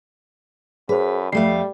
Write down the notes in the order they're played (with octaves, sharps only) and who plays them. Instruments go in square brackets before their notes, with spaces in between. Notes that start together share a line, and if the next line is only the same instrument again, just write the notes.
[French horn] F#2 [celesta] G#4 C5 [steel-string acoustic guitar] B4
[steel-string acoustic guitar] F2 A3 F5 [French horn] G3 [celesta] C7